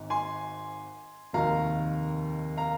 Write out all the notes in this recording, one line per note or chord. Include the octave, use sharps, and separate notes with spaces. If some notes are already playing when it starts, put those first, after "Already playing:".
Already playing: G#1 G#2
G#5 C6
F1 D#2 D#3 F5 A#5
F5 A#5